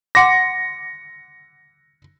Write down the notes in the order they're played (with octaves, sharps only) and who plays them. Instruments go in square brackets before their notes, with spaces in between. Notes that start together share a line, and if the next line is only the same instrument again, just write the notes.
[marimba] F#5 C6 D6 [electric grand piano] A#6 C#7